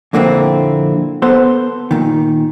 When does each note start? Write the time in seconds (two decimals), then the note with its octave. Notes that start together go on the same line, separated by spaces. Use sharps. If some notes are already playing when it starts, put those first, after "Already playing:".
0.13 F2 A#2 D3 A#3 C4 E4
1.22 B3 A4 C5
1.91 A#2 D#3